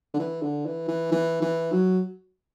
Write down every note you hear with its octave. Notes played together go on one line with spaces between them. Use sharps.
D3
E3
D3
E3
E3
E3
E3
F#3